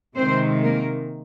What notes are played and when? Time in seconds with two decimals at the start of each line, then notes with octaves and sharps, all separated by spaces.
0.17 C3 D#3 G#3 C4 C5
0.62 A#3 A#4